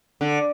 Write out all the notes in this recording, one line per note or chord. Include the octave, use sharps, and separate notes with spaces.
D3